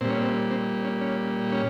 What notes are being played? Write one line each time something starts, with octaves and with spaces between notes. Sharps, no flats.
A#2 G3 C4
C#4
C4
C4
C#4
C#4
C#4